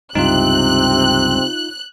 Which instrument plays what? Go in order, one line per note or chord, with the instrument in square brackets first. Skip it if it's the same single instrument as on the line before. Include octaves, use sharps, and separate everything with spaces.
[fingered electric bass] C#2 G2 [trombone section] C3 C4 [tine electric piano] D#4 F4 [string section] F#6